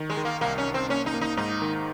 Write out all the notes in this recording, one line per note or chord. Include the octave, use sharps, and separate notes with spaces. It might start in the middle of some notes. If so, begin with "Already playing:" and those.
Already playing: D#3
G#3
D#3
A#3
C2 A#3
C#4
C2
C4
A#3 C#4
D#4
A#3
D#4
G#2 D#4
D#3